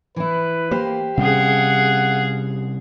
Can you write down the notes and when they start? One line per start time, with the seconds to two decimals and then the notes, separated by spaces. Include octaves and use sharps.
0.16 E3 E4 B4
0.71 A#3 G4 C5
1.17 C3 G3 C#4 G#4 F5 F#5